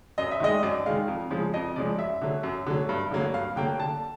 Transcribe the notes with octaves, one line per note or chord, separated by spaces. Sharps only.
F#2 D#5
E5
D#3 G#3 D#5
F#2 D5
D#3 G#3 F5
F2
C#3 F3 G#3
F2 D#5
C#3 F3 G#3 D5
F#2 E5
D3 F#3
F#2
D3 F#3
G2
D3 F#3 A#3
G2 F5
D3 F#3 A#3 G5
D3 A5